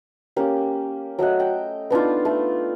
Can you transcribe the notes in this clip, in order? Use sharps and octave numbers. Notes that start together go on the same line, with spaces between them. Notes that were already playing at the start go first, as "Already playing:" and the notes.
A#3 C#4 G4
F#3 A3 D#5 F#5
G5
B3 D4 D#4 F4
A3